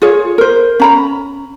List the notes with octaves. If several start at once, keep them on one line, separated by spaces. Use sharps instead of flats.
F4 G#4 C#5
A#4 C5
C#4 A#5 B5